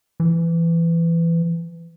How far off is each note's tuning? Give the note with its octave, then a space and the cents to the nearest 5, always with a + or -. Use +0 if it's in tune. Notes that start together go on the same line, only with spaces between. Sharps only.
E3 +20